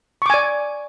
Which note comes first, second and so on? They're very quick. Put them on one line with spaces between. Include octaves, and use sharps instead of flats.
C#6 D6 G#5 D5